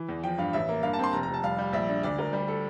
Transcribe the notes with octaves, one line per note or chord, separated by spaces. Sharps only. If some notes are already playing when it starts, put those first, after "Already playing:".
Already playing: E3
E2
F3 G5
G2 F5
A1 E5
A#3
G2 F5
A5
C4 C6
F1 A#5
A#5
F1
A5
G3 F5
G3
A#1 E5
D4
D2 D5
D2 A#4
G3
A4